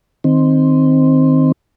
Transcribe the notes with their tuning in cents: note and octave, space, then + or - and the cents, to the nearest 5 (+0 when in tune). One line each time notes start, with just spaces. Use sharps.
D#3 +0 C4 +0